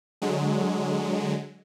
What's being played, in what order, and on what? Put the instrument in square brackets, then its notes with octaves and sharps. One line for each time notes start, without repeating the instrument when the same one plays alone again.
[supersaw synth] D3 F#3 G#3